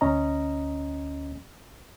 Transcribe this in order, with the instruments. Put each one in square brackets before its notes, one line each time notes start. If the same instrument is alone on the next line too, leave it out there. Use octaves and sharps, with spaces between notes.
[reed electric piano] D2 C#4 D#5 A#5